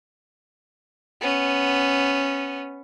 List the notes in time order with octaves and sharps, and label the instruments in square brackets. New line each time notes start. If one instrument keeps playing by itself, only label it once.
[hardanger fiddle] B3 C#4